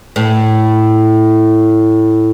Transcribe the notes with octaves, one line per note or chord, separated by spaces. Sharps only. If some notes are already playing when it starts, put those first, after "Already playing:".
A2